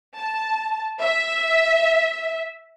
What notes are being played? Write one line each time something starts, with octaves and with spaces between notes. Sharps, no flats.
A5
E5